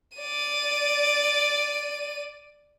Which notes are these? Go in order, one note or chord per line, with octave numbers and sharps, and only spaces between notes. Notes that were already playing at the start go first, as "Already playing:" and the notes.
D5 D#7